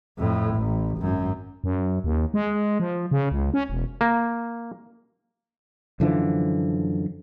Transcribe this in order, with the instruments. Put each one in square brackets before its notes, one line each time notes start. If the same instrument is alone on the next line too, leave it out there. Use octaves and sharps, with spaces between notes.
[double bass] F2 A2
A1
G#1 F#2
[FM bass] F#2
D#2
G#3
F3
C#3
C#2
C#4
E1
[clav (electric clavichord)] A#3
[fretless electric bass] F#2 D3 E3 F3